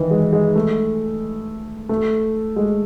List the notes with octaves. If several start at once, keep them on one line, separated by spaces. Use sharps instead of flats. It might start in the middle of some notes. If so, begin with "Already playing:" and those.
Already playing: D#3 E3
G#3
G#3
A3
A3
G#3